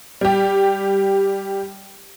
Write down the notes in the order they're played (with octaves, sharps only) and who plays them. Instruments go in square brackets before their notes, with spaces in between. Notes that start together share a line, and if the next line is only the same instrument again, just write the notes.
[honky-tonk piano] G3 G4